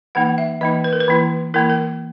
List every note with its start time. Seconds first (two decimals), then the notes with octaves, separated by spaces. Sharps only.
0.15 E3 A#3 D#4 F#5
0.38 E5
0.61 E3 A#3 D#4 D#5
0.84 B4
0.93 A#4
1.00 B4
1.08 E3 A#3 E4
1.54 E3 A#3 E4 A#4
1.70 A#4